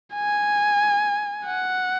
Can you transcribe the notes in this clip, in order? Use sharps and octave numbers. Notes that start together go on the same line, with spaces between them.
G#5
F#5